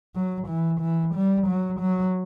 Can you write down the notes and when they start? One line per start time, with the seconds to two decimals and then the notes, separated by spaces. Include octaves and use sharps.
0.15 F#3
0.48 E3
0.81 E3
1.15 G3
1.48 F#3
1.80 F#3